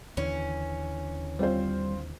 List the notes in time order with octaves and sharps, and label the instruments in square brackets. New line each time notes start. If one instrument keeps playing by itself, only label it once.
[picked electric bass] D#2 D3 E3 [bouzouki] C#4
[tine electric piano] G3 [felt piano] C4 F4 C5